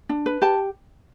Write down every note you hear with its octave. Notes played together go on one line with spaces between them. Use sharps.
D4
B4
G4 A5